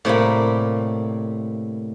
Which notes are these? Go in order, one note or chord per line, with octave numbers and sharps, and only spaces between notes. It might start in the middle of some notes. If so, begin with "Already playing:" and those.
A2 C3 G3 A#3